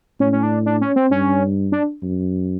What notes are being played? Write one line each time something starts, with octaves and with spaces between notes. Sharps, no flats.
A2 C#4
C#4
D4
D4
C#4
C4
G2 C#4
D4
F#2